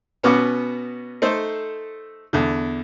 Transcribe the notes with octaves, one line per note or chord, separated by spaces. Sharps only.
B2 B3 C#4 F#4 D6
A3 D#4 A4 C5
E2 D3